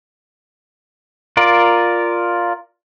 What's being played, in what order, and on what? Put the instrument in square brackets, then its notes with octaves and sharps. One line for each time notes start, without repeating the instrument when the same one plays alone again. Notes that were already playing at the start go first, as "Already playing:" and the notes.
[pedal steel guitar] F4 A#4 D5